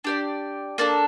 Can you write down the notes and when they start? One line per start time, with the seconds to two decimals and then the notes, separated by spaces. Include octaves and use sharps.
0.04 D4 G4 D5
0.78 A#3 D4 A4